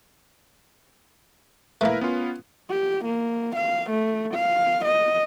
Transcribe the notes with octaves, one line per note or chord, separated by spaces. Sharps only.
A3 A#3 E4 A#4 B4
B3 C#4 F4
G4
A#3
F5
A3
F5
D#5